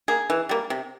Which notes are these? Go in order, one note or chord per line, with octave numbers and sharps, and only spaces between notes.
A#3 G#4
E3
G3 A#3
C3